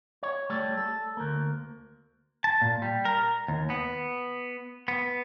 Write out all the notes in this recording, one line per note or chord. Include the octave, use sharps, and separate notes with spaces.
C#5
G3 A3 A4 C#5
A4
D2 A#3
A5
A#2
G3
A#4
D#2
B3
B3